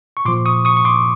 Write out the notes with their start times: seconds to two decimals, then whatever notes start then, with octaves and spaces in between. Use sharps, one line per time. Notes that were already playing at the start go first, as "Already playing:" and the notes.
0.17 C#6
0.25 A#2 F3 C6 D6
0.45 C#6 D#6
0.65 C#6 D#6
0.77 C#6
0.85 C6 D6